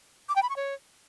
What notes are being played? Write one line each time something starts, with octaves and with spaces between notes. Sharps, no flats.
D6
G5
B5
C#6
C#5